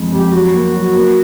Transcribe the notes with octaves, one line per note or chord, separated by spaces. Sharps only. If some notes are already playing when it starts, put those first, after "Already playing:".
Already playing: F2 G#3
F2 G4
F#3 F#4
A#3
F#3
A#3